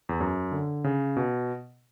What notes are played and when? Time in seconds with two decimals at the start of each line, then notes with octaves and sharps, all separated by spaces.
0.09 E2
0.20 F#2
0.52 D3
0.84 C#3
1.16 B2